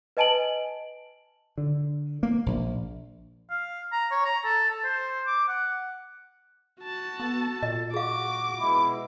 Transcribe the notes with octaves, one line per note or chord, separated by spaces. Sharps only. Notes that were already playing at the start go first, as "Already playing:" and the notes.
B4 D#5 G#5 A5 D7 F#7
D3
A#3
A#1
F5
A#5
C#5
A#5
A4
A5
C5
D6
F#5
F#4 A5
B3 A4
A#2 D#5
F#4 G#4 F5 D6
B2 G#3 E4